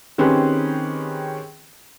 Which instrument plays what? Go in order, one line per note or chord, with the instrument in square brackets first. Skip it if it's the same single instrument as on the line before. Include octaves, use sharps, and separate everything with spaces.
[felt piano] D#3 C4 C#4 G4 G#4 B4